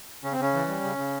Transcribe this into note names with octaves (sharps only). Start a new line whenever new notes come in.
C#3 C#4
C4
C#3 C#4
E3
G3
C#3
C#3